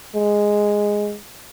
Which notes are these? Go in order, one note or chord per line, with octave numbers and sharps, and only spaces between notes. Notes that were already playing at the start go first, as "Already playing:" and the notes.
G#3